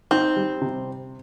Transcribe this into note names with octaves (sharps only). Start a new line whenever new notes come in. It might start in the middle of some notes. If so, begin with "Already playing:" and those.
C4 D#4
G3
C3